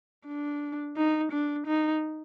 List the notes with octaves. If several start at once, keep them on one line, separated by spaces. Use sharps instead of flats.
D4
D#4
D4
D#4